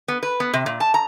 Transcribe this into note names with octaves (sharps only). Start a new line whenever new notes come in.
B3
B4
B3
C3
A#2
A5
A#5